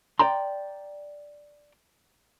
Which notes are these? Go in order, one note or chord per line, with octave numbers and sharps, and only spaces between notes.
D5 G5 A#5 C6